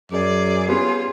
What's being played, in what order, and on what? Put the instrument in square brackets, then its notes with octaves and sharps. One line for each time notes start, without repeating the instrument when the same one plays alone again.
[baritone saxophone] F#2 [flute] G#4 [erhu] D5
[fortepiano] G3 B3 C#4 [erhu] F4